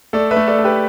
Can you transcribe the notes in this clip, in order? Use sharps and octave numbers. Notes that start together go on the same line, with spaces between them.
A3 A4 D5
B4 E5
A3
A4 D5
A3
G4 B4